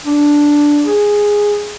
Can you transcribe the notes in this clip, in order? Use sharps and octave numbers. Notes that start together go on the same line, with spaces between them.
D4
G#4